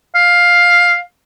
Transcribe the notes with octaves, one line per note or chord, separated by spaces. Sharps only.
F5